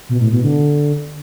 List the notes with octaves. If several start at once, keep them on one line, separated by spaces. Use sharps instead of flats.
B2
A2
B2
D3